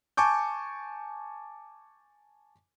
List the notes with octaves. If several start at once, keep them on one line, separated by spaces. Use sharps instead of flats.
G#5 A5 C#6 D6 G6